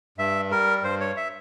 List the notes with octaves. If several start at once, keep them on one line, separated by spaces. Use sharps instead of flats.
G2 E5
G3 A#4
G2 C5
C#5
E5